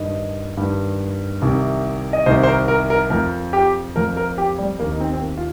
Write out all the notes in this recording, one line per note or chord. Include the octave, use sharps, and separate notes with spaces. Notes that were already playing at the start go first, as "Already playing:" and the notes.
Already playing: G2 D#3 D#5
G2 D#3
C2 C3 D#3
D#5
C2 C3 D#3 C5
C5
A#4
A#4
A#4
F2 F3 A#4
G4
F2 F3 A#4
A#4
G4
G3
D#2 D#3 A#3
D#4
C4
C4
A#3
F4